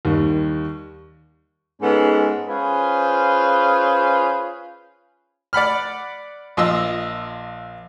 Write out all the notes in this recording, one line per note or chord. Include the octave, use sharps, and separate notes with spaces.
D#2 D#3 G3
G#2 G#3 B3 C#4 A4
C#4 F4 G#4 B4 C5
D5 F#5 B5 F6
A#1 F4 D#5 E6